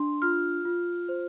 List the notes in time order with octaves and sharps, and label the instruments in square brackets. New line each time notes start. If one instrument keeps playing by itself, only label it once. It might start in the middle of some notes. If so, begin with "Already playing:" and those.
Already playing: [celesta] D4 C6
F4 F6
F4
C5